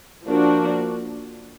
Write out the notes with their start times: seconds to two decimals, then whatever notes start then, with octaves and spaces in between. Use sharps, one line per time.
0.25 F3 A#3 D4 F#4